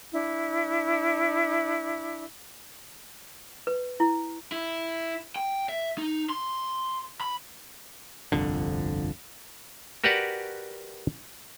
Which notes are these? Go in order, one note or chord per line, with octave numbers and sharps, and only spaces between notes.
D4 E4
B4
E4
E4
G5
E5
D#4
C6
B5
G1 C2 F2 D3
F#4 G4 A#4 B4 D5 F#5